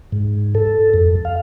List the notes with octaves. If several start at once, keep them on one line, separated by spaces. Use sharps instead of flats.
G#2
A4
F2
F5